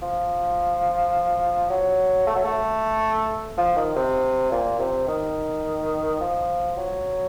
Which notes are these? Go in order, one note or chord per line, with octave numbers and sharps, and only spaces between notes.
F3
F#3
A3
F#3
A3
F3
D#3
C3
A#2
C3
D#3
F3
F#3